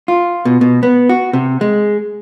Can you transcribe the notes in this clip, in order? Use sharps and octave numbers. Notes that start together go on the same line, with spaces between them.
F4
B2
B2
B3
F#4
C3
G#3